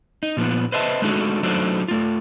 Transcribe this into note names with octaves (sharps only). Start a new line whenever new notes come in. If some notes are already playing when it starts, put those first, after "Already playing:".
D#4
A#2 F3 B3
B4 C5 D#5 E5 G#5 A5
G#3 A3 D4 D#4 F#4
F#3 A3 D4 D#4 F#4 C5
A3 F4